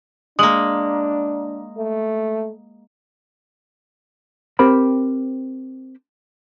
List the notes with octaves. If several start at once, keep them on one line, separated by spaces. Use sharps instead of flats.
G#3 A#3 D4 D#6 F#7
A3
C4 G4 A#4 C5 G5 B5